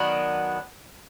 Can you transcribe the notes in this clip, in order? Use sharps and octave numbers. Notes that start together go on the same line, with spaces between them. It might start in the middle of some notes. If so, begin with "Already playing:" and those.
Already playing: D#3 F#3 B3 D4